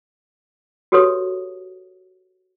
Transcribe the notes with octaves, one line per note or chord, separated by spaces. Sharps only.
F#4 G4 A4 B4 C#5 D#6